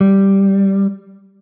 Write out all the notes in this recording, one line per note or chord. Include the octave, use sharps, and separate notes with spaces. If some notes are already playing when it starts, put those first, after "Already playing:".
G3